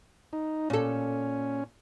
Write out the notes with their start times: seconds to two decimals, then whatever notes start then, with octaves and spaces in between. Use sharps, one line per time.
0.33 D#4
0.70 A#2 C#4 A4